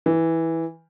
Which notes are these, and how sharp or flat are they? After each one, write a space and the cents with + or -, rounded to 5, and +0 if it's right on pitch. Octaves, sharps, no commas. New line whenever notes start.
E3 -10